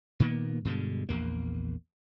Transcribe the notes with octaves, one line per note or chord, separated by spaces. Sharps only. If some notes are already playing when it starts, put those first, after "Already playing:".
A#2 D#3 A#3 B3
G2 B2 D3 G#3
A#1 E2 A#3